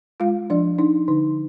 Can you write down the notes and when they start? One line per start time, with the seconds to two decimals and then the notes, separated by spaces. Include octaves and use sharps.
0.20 G#3 F4 F5
0.50 F3 D4 D5
0.78 D4 D#4
1.08 D3 D#4